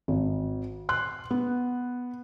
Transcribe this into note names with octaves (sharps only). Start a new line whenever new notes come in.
G#1
C6 F#6
B3